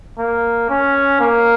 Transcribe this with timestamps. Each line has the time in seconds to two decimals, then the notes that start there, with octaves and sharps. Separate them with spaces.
0.19 A#3
0.70 C#4
1.20 A#3